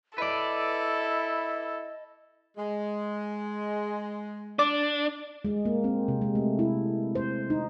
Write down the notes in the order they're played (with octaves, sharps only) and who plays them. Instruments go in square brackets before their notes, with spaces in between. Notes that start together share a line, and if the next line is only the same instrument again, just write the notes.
[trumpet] E4 [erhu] A4 [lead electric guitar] B4 D5 [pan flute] D#5
[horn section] G#3
[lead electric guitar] D4 [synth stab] D5
[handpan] G#3
A#3
C4
C3
G#3
A3
E4
C5
D#4